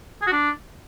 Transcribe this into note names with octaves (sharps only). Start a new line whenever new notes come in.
G#4
F#4
D4